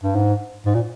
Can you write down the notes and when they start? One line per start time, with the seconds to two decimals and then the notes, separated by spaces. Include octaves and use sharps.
0.03 G2
0.15 G#2
0.66 G#2
0.75 A#2